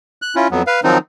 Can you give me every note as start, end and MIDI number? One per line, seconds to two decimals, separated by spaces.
0.22 0.35 90
0.36 0.48 61
0.36 0.48 64
0.36 0.48 65
0.51 0.62 41
0.51 0.62 54
0.51 0.62 59
0.67 0.80 71
0.67 0.80 77
0.84 0.98 51
0.84 0.98 53
0.84 0.98 54
0.84 0.98 60
0.84 0.98 63